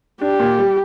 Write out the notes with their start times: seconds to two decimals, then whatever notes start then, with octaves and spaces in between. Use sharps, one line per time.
0.21 D4 G4
0.39 A#2
0.58 G3